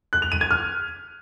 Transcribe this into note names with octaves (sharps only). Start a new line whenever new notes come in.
F#6
F7
D#7
G#6
F6